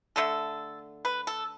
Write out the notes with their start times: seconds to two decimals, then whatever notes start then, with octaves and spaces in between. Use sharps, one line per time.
0.16 D3 A3 A4
1.05 B4
1.27 A4